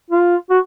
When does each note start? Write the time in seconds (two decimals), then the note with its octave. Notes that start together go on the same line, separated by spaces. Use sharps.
0.11 F4
0.50 F#4